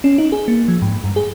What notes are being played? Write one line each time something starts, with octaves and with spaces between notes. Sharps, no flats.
C#4
D#4
G#4
A#3
F3
G#2
G2
G#4